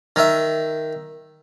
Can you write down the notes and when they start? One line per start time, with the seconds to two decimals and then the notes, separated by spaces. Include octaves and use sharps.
0.16 D#3 E5